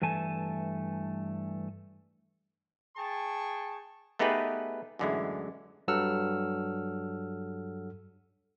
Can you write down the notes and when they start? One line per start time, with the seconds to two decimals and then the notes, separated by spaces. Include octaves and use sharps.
0.02 G2 E3 A3 G#5 A5
2.97 G#4 G5 A5 C#6
4.19 A3 B3 D#4 G4 G#4 B4
4.99 F#2 A2 D3 E3 G#3 E4
5.88 G2 F#3 A4 F#5 E6 F6